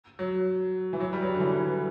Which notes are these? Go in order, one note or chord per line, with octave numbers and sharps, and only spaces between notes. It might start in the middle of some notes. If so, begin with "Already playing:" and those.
F#3
E3
F#3
G3
F#3
G3
D3
E3
E3